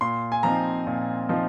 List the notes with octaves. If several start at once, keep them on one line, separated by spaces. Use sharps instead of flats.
A#2 C6
G#5
F3 C4 D#4 A#5
A#2
F3 C4 D#4